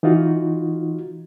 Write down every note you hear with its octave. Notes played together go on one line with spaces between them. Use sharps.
E3 D#4 F4 F#4